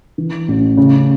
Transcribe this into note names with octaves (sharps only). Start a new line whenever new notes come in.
E3
A1
C#3